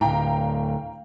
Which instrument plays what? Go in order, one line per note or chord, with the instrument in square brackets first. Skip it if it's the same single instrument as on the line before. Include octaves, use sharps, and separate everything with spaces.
[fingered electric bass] D2 A2 [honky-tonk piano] F5 G5 A#5